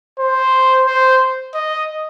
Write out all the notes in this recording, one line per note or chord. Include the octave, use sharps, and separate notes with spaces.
C5
C5
D#5